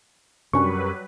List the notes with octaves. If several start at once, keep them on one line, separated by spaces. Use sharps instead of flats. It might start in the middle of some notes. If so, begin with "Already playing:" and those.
F#2 C3 F#3 G3 C#4 D4 B4 C#6